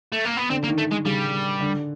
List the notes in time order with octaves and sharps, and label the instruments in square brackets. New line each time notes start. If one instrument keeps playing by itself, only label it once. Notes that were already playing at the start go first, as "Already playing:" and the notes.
[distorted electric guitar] A3
A#3
B3
[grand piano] D3 [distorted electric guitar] C4
[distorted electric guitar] A#3
[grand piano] D#3
[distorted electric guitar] A3
G#3
[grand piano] C#3 [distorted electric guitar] G3
[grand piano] D3